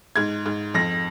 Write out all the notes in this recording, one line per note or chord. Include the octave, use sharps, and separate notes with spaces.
G#2 G#6
G#2
F2 A#6